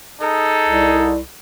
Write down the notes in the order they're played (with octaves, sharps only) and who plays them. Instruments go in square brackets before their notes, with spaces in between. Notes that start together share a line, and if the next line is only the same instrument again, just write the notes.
[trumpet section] D#4 G#4 A4
[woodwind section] C2